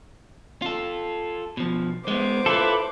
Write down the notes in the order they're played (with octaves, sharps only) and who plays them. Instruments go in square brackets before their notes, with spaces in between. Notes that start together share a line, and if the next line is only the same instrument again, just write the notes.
[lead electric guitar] F4 A4
B2 F3
[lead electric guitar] G#3 B3 [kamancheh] C5 D6
[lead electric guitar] E4 F4 [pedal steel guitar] A4 B4